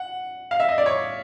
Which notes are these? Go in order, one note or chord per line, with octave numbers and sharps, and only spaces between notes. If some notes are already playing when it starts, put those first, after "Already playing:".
Already playing: F#5
F5
E5
D#5
D5
C#5